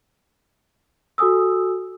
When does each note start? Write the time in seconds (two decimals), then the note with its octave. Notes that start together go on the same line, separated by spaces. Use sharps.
1.18 F#4 A4 G#5 D#6 E6